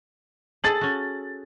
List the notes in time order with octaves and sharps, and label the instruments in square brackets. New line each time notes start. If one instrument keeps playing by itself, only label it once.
[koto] G#4 A4 [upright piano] A6 F#7
[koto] C#4 F#4